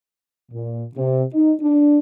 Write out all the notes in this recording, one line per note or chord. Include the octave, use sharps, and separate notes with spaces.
A#2
C3
D#4
D4